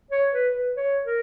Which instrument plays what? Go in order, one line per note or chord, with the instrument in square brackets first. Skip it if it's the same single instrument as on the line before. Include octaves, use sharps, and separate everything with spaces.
[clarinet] C#5
B4
B4
C#5
A#4